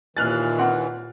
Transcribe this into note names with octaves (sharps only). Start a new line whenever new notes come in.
D#2 A#2 E3 G#5 F6 F#6 A6
C4 F#5